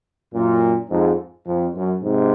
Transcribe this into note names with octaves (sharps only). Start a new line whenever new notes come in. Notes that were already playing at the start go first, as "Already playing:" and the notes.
F#2 A#2
F2 G#2
F2
F#2
G#2 C3